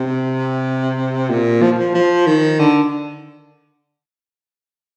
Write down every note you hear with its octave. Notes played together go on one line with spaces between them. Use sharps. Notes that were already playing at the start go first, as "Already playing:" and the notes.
Already playing: C3
A#2
F3
F3
F3
D#3
D3